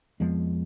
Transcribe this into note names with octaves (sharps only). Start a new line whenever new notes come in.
F2 F3 G#3 B3